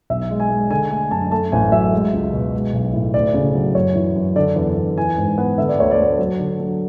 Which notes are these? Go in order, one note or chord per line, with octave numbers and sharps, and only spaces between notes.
B1 E5
G#3
G#5
G#3
D3 G#5
A3 G#5
F#2 A5
A3 A5
A1 G#5
F#3 E5
G#3
C#2
B2
G#3
B1
A2
D2 D5
C#3
F#3
F#2 C#5
E3
F#2
D3 D5
E2
E2
E3 G#5
G#2
B3
D3 E5
D5
D2 C#5
D5
D2
F#3
D3
F#3